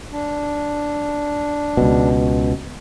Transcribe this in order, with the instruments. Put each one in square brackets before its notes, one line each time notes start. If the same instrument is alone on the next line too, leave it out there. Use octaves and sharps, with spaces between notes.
[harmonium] D4
[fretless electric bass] C#2 B2